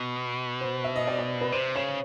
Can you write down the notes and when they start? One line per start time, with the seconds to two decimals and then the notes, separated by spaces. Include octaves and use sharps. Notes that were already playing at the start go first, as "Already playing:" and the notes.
Already playing: B2
0.61 C5
0.84 E5
0.96 D#5
1.07 D5
1.19 D5
1.41 B4
1.52 C3 C5
1.76 C#3 C#5